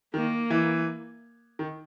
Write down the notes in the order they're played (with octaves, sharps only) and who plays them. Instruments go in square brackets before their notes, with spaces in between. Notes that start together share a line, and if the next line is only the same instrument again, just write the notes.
[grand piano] D#3 [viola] A#3
[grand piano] E3
D#3